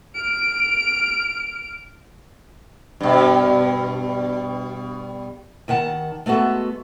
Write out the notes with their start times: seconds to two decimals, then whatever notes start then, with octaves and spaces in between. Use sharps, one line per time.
0.15 F6 D7
3.01 G2 B2
5.68 D#2 D#3 F#5 A5
6.26 G#3 A3 B3 F#4 A4